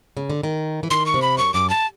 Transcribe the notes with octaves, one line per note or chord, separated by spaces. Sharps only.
C#3
D3
D#3
E3
D#3 C6
C#6
C3
B5
F#2 C#6
F#2 D6
A5